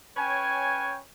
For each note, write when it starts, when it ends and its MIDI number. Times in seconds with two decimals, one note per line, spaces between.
0.17 0.98 61
0.17 0.98 71
0.17 0.98 73
0.17 0.98 79
0.17 0.98 80